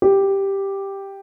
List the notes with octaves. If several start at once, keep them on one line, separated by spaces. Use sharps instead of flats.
G4